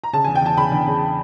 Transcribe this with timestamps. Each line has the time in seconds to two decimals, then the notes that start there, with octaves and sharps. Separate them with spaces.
0.04 A#5
0.13 C#3 A5
0.24 E2 G#5
0.35 G5
0.42 E2 A5
0.57 C#3 B5
0.72 E2
0.87 C#3